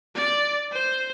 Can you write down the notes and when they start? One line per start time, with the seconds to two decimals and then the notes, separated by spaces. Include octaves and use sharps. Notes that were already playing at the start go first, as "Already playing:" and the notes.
0.15 D5
0.72 C5